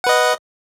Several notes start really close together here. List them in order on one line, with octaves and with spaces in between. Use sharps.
F#5 B4 D#5